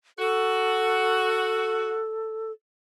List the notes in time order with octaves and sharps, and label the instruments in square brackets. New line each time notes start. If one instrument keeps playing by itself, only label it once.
[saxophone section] F#4 [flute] A4